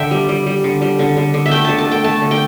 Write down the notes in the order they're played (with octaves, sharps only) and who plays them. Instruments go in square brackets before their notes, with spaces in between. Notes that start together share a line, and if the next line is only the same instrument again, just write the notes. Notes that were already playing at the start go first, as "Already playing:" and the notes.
Already playing: [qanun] D3 E5 G5
G3
G3
G3
D3
G3
D3
D3
D3
E5
A3 G5
D3 A5
A5
A3 G5
A3 A5
D3
G5